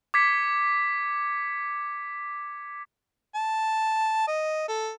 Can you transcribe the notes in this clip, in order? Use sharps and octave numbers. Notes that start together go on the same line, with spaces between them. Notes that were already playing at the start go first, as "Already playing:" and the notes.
D6 G#6 B6 C#7
A5
D#5
A4